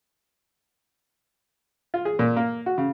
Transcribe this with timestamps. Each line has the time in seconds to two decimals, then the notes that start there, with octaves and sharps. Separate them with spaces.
1.94 F4
2.05 G#4
2.19 A#2
2.36 A#3
2.66 F#4
2.78 C#3